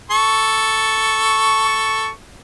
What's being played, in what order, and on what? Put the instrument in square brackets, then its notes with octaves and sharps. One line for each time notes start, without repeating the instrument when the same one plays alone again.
[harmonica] A4 C#6